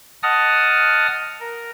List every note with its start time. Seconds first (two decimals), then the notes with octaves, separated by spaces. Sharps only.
0.23 D#5 F#5 A5 D#6 F6
1.40 A#4